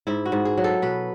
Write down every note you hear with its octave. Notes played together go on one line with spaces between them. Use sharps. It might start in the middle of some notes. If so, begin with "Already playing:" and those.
G#2 E4
F#4
G#2
G#4
F#3
A4
B2 B4